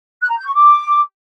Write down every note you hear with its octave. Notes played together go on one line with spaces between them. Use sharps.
F#6
A#5
G6
C#6
D6